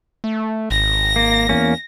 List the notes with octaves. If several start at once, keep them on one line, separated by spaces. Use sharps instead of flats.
A3
G#1 A#6
A#3
E2 A#3 C#4